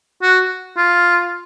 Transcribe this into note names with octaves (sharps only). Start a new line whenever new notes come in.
F#4
F4